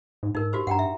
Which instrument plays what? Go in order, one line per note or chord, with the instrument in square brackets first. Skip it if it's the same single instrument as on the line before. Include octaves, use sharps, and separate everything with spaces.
[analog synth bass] G#2
[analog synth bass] G#2 [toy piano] D#4 A#4
[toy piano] F#4 G4 C5
[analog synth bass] G2 [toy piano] F#5 G5 A#5
[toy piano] E5